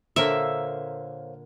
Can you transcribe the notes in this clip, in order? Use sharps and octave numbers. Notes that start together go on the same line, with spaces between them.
A#2 D3 A#3 C5 C#5 E5 F5